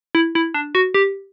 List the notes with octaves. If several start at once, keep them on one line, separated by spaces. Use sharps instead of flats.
E4
E4
D4
F#4
G4